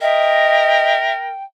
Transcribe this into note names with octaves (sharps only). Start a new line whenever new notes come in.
A#4 D#5 E5 G5